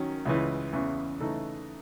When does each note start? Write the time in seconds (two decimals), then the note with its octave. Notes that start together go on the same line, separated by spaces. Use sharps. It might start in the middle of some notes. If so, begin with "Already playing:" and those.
Already playing: D#3 F#3 C#4
0.25 C#2 C#3 E3
0.73 E2 C#3 E3
1.20 C#3 E3 A3 D#4 A4